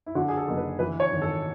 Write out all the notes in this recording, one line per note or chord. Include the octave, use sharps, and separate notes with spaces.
E4
D3 F#4
G#4
A4
F#1
B4
E3 B4
C#5
G#1
A4